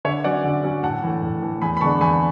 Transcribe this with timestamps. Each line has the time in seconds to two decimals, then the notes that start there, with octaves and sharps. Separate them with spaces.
0.05 D3 C#5 E5
0.24 F#3 C#4 D5 F#5
0.44 D3
0.64 F#3 C#4
0.83 A2 F#5 A5
1.03 E3 A3
1.23 A2
1.42 E3 A3
1.62 E2 G#5 B5
1.77 B5
1.81 D3 G#3 B3 D4 A5 C#6
2.01 E2 G#5 B5